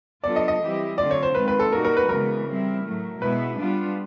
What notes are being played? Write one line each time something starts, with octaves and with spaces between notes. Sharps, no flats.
F#3 B3 D4 F4 A4 D5
D#5
D#5
E3 G3 C4 E4 G4
D3 F#3 A3 C4 F4 D5
C#5
C5
D#3 G#3 C4 F4 B4
B4
A4
A#2 G3 A#3 D#4 F#4 A#4
A#4
B4
C#3 E3 G#3 B3 A#4
G3 C4 E4
A2 F#3 A3
B2 G#3 B3 E4 B4
G3 B3 D4 F4